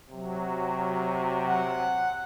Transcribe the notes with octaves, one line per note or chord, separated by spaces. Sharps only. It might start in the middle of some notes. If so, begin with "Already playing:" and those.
C3 F#3
F#5